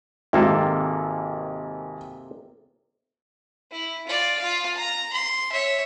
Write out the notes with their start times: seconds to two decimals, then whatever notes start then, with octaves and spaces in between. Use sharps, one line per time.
0.33 G#1 C3 A#3 A4
3.72 E4
4.07 F4 D5
4.40 F4 F5
4.75 A#5
5.13 C6
5.52 C#5 E5